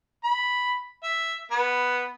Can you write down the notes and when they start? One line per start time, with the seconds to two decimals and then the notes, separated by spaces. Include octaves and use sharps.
0.24 B5
1.04 E5
1.51 B3